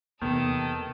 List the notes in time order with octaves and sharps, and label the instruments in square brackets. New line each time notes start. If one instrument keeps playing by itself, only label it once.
[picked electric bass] E2 C3 [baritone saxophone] D#3 [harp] B3 [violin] A4 D#6